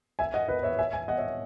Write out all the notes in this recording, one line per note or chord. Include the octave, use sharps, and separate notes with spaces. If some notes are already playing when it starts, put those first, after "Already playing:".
E5 G#5
D#5 F#5
B4 D#5
C#5 E5
E5 G#5
E5 G#5
D#5 F#5
C#5 E5